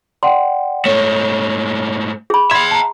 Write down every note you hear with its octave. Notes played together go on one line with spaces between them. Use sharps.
D5 F#5 G5 C6
G#2 A3 C#5
G#4 B5
E5 F#5 B5 C6 G#6
A5 A#5